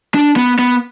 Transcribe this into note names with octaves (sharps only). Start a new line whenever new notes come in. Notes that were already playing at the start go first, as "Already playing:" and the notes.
D4
B3
B3